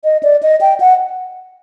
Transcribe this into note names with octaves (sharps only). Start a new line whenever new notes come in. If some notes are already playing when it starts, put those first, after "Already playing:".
D#5
D5
D#5
G5
F#5